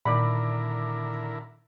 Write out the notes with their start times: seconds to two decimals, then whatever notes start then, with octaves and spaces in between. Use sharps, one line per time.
0.06 A#2 D3 D#3 E4 A#4 D5 B5 D6